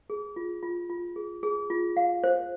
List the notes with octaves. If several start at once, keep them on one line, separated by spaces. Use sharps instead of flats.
G#4
F4
F4
F4
G#4
G#4
F4
F5
C5